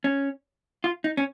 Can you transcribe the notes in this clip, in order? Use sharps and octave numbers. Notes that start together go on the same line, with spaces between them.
C#4
F4
D#4
C#4